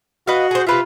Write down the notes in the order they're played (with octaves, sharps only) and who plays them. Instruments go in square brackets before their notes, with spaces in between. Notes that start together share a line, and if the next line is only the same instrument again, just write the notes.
[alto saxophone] F#4 [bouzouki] B4 D#5 F5
[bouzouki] G#4 C5
[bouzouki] C3 B4 E5 [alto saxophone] F4